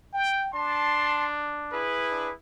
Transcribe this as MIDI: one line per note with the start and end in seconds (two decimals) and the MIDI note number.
0.14 0.49 79
0.53 1.85 62
0.53 1.26 81
0.53 1.26 84
1.72 2.32 64
1.72 2.32 68
1.72 2.32 71
2.11 2.29 62